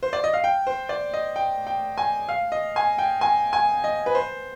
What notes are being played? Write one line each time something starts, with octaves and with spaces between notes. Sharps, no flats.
C5
D5
D#5
F5
G5
C5
D5
D#5
G5
G5
G#5
F5
D#5
G#5
G5
G#5
G#5
D#5
B4
C5